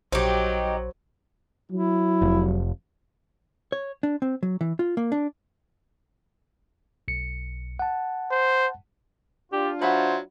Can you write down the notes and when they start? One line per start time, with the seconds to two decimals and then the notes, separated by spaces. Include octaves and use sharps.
0.12 A#1 F#3 D#4 G4 C5
1.71 F#3 E4
2.22 F1
3.72 C#5
4.03 D4
4.22 C4
4.43 F#3
4.61 E3
4.79 F4
4.97 A#3
5.12 D4
7.08 B1 C#7
7.79 F#5 A5
8.31 C5
9.53 D4 F4 G4
9.81 F#3 C5 E5 F#5 B5